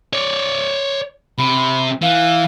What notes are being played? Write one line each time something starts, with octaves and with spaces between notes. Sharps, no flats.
C#5 D5
C3 B5
E3 F5